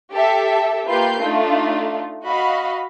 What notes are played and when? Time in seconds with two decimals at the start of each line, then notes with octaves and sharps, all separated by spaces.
0.10 G4 A4 E5
0.89 A#3 F4 G4 B4 G6 C7
1.20 A3 D4 D#4 F4
2.25 F#4 D#5 F5 B5